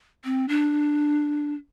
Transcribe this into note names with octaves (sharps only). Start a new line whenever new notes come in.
C4
D4